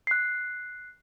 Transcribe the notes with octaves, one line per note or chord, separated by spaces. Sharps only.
F#6 C7